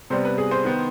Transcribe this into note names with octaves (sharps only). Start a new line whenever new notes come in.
C3 G3 B3 C5
B4
G#4
C5
D#3 B3